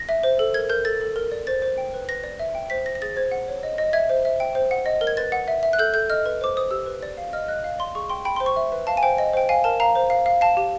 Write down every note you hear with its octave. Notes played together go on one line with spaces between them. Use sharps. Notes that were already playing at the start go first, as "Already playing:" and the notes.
Already playing: A#6
E5
C5
A4
A#4 G#6
A#4 G6
A4 A6
A4
A#4
D5
C5 A6
C5
G5
B4
B4 A#6
D5
E5
G5
C5 B6
C5 A#6
A#6
G#4 A6
C5 G#6
F#5
C#5
D#5
D#5
E5 G#6
C5
E5
G5
C5
F#5
D#5
A#4
G#6
B4 A6
F#5
E5
E5
F#6
A4 G6
A4 G6
D#5 F6
B4
C5 D6
C5 D#6
G4 E6
B4
D5
F5
D#5 F6
D#5 F#6
F5
D5 C6
G#4 C#6
G5 C6
G5 B5
C6
C5
C#6
E5
B4
F5 A5
G#5
C5 G5
D#5
C5 G5
F5 G#5
A#4 A5
F5 A#5
C5
F5
F5
F5 A5
G4